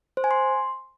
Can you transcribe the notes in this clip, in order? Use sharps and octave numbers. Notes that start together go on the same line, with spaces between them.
C5
G#5
C6